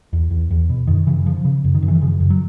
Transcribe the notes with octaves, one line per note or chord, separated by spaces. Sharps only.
E2
E2
E2
B2
F#2 D#3
C#3 E3
C#3 F3
C#3
F#2
D#3
F#2
E3
C#3 F3
F#2
F#3